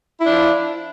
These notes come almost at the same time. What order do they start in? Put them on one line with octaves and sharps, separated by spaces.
E4 D4 F3